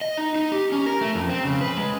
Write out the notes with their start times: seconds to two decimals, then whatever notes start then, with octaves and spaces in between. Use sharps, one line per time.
0.01 D#5
0.17 D#4
0.36 D#4
0.52 G4
0.72 C#4
0.86 A#4
1.01 A3
1.15 F2
1.29 C4
1.44 C#3
1.61 B4
1.77 G#3